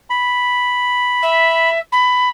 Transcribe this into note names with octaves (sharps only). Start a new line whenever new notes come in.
B5
E5
B5